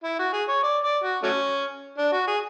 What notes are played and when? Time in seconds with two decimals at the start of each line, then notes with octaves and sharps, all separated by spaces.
0.04 E4
0.19 F#4
0.33 G#4
0.49 C#5
0.64 D5
0.84 D5
1.04 F#4
1.23 F#3 A3 C#4
1.98 D4
2.13 F#4
2.27 G#4